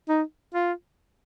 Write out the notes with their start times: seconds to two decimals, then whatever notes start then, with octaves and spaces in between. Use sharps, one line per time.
0.09 D#4
0.54 F4